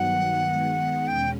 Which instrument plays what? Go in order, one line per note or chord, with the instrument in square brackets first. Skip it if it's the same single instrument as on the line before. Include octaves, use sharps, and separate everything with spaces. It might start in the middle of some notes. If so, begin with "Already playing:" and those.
Already playing: [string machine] G2 D#3 F#3 B3 [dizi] F#5
[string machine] D#3 G#3 B3
[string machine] E2 B2 G#3 C#4 [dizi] G5